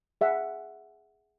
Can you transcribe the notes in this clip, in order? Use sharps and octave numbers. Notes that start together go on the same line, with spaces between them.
G#4 E5 F#5